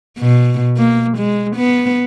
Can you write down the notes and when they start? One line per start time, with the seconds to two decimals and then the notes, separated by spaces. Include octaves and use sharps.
0.19 B2
0.77 A#3
1.17 G#3
1.56 B3